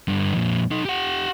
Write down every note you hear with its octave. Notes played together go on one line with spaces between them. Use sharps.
G2 D3
F2 A#2
D#4 A4
G4 F#5